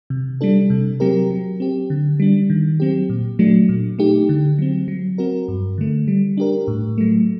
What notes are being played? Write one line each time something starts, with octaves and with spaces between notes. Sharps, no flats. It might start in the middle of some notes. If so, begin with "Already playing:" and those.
C3
G3 D4 A4
C3
F#3 C4 G4 A#4
F#3
C4 G4
D3
G3 D4
D#3
F#3 C4 G4
A#2
F#3 A3 D4
A#2
A3 D#4 G4
D3
F#3 C4
F#3
C4 F#4 A#4
G2
D3 A3
G3
D4 G4 A#4
A2
F#3 A3